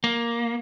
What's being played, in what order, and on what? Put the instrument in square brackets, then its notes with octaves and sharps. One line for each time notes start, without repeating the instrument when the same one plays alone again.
[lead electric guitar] A#3